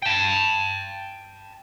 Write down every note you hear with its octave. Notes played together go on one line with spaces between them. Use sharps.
G5 A5